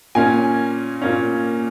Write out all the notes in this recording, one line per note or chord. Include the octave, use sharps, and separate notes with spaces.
A#2 A#3 C#4 G#5
A#2 A#3 C#4